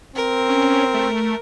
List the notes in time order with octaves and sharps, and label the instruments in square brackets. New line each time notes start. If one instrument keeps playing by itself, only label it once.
[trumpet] C4 [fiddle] A#4
[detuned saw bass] C#4
A3